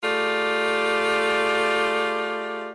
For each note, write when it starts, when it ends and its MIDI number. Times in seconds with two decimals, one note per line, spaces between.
0.03 2.71 57
0.03 2.71 65
0.03 2.71 67
0.03 2.71 68
0.03 2.71 74